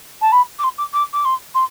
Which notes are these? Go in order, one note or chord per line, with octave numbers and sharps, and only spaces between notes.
A5
B5
D6
C6
D6
D6
D6
C6
C6